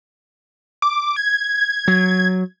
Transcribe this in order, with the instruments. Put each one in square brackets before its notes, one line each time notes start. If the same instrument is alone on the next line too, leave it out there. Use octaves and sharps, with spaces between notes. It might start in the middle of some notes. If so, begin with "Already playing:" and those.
[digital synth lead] D6
G#6
[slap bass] F#3